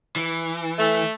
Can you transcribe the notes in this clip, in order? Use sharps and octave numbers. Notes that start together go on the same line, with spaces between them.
E3
A3